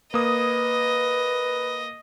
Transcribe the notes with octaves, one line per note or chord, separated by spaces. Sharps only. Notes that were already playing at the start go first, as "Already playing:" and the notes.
A#3 B4 D#5 D#6